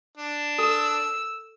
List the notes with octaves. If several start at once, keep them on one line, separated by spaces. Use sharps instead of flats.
D4
A4 E6